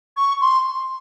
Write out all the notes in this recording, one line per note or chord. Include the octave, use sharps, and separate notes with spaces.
C#6
C6